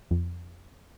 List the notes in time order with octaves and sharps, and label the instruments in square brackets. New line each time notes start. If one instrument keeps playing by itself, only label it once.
[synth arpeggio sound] F2